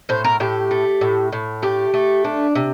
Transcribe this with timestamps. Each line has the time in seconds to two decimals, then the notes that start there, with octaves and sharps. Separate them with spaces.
0.09 A2 C5
0.24 A#4
0.40 A2 G4
0.71 A3
1.01 A2
1.32 A2
1.62 A3 G4
1.94 A3
2.24 D4
2.55 C3